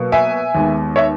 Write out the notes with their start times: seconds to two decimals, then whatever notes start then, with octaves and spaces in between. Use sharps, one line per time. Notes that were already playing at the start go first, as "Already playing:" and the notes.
Already playing: B2 F#3 A#3
0.12 E5 G#5
0.55 D#2 D#3 G#3 B3
0.96 C#5 E5